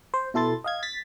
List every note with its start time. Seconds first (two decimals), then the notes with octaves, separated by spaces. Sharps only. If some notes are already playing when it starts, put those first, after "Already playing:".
0.14 C5
0.34 B2 E4 A4 C6 A6
0.64 D#5 F5 G#6
0.83 A6 B6